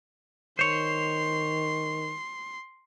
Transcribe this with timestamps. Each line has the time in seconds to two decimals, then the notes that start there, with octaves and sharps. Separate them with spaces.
0.59 D#3 C5 C#5 C6